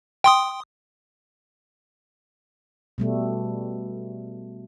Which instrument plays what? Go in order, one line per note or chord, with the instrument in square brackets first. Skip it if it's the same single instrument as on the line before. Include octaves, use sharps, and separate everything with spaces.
[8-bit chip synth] G5 C6 D#6
[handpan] B2 G3 A3